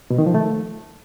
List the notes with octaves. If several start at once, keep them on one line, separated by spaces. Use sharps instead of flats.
B2
D#3
F3
A3